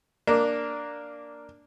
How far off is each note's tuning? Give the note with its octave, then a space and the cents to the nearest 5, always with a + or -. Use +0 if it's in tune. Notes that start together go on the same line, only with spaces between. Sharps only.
A#3 +0 D4 +0